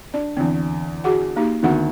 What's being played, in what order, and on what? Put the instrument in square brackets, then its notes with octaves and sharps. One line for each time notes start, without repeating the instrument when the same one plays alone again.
[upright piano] D4 [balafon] D5
[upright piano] E2 D3 [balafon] C4
[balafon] F#4 G#4 F#5
A#3 D#4 G4
[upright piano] D2 D#3 [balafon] B3 F#5